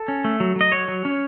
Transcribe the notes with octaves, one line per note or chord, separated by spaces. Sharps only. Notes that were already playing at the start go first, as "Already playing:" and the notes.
Already playing: A4
C#4
A3
F#3
F#3 D#5
F#3 C#5
F#3
C#4